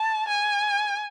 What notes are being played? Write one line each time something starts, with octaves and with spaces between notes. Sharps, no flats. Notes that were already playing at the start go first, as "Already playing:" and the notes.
Already playing: A5
G#5